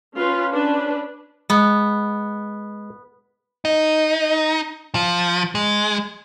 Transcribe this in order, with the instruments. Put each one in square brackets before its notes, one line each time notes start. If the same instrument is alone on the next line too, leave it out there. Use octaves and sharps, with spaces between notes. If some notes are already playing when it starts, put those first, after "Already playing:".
[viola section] C#4 F4 B4
C#4 D4 B4
[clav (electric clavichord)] G#3 [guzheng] B3
[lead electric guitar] D#4
F3
G#3